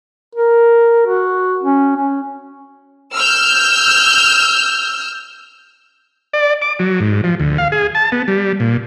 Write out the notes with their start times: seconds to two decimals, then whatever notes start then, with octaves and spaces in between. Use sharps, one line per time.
0.35 A#4
1.07 F#4
1.63 C#4
1.96 C#4
3.16 E6 F6 G6
6.33 D5
6.62 D6
6.79 F#3
7.01 G#2
7.24 F3
7.40 D2
7.58 F5
7.72 G#4
7.95 A5
8.12 B3
8.28 G3
8.60 A#2